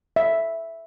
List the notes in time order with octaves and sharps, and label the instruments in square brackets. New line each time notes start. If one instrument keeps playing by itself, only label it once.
[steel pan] E5